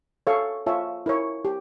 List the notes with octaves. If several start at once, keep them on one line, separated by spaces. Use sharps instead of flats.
A4 C#5 F5 C#6
F4 C#5 E5 A5
E4 A#4 C#5
G4